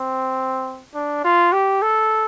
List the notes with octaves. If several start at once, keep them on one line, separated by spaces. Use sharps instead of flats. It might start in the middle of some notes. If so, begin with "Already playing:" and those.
Already playing: C4
D4
F4
G4
A4